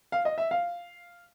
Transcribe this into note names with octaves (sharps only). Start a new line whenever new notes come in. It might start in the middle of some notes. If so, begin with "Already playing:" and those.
F5
D#5
E5
F5